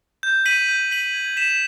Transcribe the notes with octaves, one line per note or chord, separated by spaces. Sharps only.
G6
B6 D#7 F#7
G6
B6 D#7 F#7
G#6
B6 E7